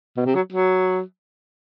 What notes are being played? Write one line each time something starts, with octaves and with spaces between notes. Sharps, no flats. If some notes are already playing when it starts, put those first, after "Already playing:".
B2
C3
F#3
F#3